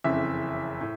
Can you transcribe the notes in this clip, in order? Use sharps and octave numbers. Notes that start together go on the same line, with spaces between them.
F#1 F2 C#3 E3 E5
A2